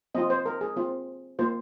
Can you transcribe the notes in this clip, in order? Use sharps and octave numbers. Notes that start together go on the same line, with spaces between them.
C4 F4 D#5
C5
A#4
G#4
C4 F4
A#3 F4 C5